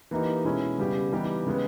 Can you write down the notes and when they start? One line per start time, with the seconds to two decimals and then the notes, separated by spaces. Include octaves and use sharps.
0.11 E3 A#3 D#4 G4
0.44 B2 G#3 C#4 E4
0.78 C#3 G3 B3 G4
1.12 E3 G3 B3 D#4 G4
1.47 C#3 G#3 B3